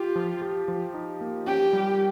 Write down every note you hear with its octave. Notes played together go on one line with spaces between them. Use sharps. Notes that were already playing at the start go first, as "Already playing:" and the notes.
Already playing: F4 G4
F3
G4
F3
D#4
A#3
C#4 G4
G3